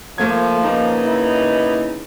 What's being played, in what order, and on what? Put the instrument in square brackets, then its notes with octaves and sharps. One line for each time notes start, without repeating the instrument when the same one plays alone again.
[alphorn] F3 [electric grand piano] A3 A#3 G#6
[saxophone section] C#3 B3 D#4 [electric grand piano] A#3
[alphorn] E4